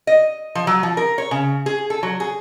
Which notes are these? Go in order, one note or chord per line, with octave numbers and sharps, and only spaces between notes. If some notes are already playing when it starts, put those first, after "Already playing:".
D#5
F3
F#3
F3
A#4
C#5
C#3
G#4
A4
F#3
G#4